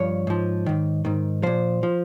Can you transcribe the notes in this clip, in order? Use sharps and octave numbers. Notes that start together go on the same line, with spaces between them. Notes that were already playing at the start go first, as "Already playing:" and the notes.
Already playing: G2 F3 C#5
G#2 F3
G#2 D#3
G#2 D#3
A#2 F3 C5
F3